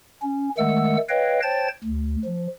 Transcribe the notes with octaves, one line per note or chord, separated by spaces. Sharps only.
C#4
D#3 G#3 A3 F#5 E6
B4 C#5 D#5 F5 G5
C5 C#5 G5 A5 A6
D2
F3